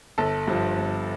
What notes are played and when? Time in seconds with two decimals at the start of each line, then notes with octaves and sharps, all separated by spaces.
0.18 G1 A4
0.48 G2 F3
0.78 G1